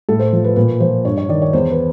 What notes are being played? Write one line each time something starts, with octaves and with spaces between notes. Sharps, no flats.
A2 A4
C5
F3
B4
A#2 B4
F3 C5
G2 C#5
C#5
D#3 D5
C#5
E2 C5
B4